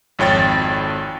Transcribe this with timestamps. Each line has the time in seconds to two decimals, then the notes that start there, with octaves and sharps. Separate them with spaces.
0.19 G#1 F2 C#5 G5 A6